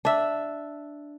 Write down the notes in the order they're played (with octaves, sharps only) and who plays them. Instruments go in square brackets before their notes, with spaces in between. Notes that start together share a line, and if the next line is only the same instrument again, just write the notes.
[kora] D4 E5